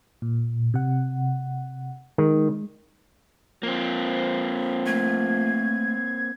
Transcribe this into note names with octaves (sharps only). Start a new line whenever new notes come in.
A#2
C3 F#5
D#3 G#3
F3 A#3 C4
A3 G#6